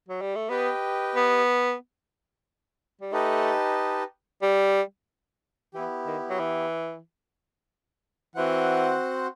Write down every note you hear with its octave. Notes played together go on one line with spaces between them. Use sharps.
F#3
G3
A3
B3 G4 B4 D#5 G5
B3
G3
A3 D#4 G4 B4 D#5 A5
G3
E3 B3 E4 G4
D#3
F#3
E3
E3 C4 F#4 C5 F#5